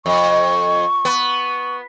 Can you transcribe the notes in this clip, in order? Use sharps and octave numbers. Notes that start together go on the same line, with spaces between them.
F2 C#6
B3